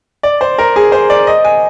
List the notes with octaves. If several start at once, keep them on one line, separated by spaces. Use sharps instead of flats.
D5
C5
A#4
G#4
C5
D5
D#5
G#5